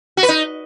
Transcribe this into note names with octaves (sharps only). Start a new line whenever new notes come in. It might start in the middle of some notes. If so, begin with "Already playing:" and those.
F#4
B4
D#4